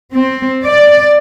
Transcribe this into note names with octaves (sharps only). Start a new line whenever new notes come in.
C4
D5